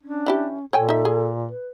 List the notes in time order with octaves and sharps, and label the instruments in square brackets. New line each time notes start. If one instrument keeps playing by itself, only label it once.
[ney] C#4 [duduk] D4
[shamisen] E3 E4 G4
[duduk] A#2 [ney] A4 [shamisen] C#5 G5 G#5
[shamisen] D#4 E5
G#4
[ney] B4